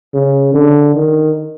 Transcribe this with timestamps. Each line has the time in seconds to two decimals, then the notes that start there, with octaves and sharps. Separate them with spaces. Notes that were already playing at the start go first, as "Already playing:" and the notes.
0.14 C#3
0.54 D3
0.94 D#3